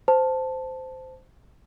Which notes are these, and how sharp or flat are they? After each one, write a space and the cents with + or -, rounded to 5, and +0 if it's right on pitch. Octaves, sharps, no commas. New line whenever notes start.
C5 -15 A5 +0